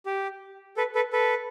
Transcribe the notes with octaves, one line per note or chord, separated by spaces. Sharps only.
G4
A4 B4
A4 B4
A4 B4